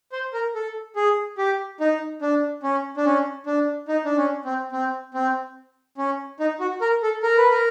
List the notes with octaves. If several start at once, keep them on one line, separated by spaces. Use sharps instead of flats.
C5
A#4
A4
G#4
G4
D#4
D4
C#4
D4
C#4
D4
D#4
D4
C#4
C4
C4
C4
C#4
D#4
F#4
A#4
A4
A#4
B4
A#4